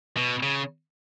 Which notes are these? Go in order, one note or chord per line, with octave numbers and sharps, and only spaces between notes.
B2
C#3